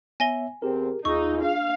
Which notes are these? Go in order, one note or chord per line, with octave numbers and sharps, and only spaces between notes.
B3 C#5 E5 G#5 A#6 G7
E2 C4 G4 G#4 A#4
D#2 D#4 F4 G#4 C#6 E6
D4 F5